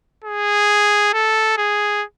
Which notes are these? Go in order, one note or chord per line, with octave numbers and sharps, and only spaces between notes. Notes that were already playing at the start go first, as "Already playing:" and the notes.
G#4
A4
G#4